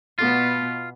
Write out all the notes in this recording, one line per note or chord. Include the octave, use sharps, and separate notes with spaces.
B2 B3 F4